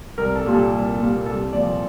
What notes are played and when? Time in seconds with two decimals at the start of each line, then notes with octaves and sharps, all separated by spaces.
0.18 C2 A#4
0.36 A4
0.46 A#2 G3 A#3
0.54 A4
0.72 C2
1.00 A#2 G3 A#3
1.26 C2 A4
1.53 A#2 F3 D5